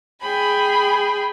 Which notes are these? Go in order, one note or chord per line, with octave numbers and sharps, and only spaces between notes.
G#4 G5 G#5 B5